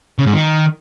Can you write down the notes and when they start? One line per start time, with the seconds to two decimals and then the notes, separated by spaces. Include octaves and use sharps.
0.19 C#3
0.26 G#2
0.33 D#3